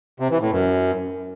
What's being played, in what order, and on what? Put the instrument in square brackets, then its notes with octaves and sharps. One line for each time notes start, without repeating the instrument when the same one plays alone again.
[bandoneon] C3
E3
A2
F#2